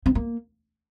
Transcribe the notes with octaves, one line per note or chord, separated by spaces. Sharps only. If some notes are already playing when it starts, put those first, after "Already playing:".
C4
A#3